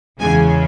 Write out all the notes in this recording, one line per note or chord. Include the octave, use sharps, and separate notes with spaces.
E2 C#3 G#3 G#5